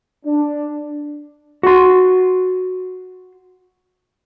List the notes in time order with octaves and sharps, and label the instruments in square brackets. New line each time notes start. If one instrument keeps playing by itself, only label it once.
[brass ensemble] D4
[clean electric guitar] F#4 C6